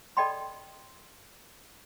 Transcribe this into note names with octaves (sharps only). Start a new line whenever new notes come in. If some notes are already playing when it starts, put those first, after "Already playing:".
A4 D5 D#5 G5 B5 C6